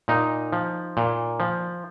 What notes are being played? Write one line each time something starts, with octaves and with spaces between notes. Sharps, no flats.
A#2 D#4
F3
A#2
F3